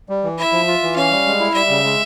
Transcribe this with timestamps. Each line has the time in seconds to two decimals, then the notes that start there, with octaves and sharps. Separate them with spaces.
0.09 G3
0.24 E3
0.38 E4 E5
0.52 F3
0.68 F4
0.82 E3
0.96 C#4 F5
1.11 G3
1.26 G#3
1.40 E4
1.54 G3 E5
1.69 C#3
1.85 G#3